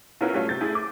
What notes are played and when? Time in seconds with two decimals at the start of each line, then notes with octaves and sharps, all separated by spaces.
0.21 B2 B3 C#4 E4 F4 A#4
0.33 F#3 G3 A3 C#4 F4
0.49 C3 G6 A6
0.61 A3 E4 G#4
0.75 D6